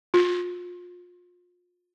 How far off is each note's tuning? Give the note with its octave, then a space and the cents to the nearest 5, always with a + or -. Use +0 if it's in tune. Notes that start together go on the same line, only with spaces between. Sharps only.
F4 +30